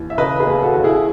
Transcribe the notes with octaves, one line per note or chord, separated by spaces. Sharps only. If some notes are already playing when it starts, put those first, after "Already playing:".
Already playing: D#2 E3
E5
C#3 B4 D#5
G#4 B4
D#2
F#4 A4
D#2
E4 G#4